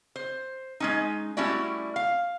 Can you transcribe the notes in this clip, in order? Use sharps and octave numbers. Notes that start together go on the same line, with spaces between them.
C5
G#3 C#4 D#4
G3 A3 C#4 E4 F#4 D5
F5